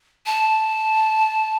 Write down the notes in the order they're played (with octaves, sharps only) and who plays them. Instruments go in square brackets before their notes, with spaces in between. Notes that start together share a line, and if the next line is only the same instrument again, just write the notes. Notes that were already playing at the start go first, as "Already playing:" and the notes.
[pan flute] A5